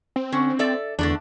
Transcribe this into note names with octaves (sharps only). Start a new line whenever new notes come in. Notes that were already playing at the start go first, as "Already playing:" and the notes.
C4
D3 C#4
A4 D5 E5
E2 D3 A3 D4